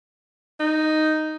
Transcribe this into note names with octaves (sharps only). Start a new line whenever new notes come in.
D#4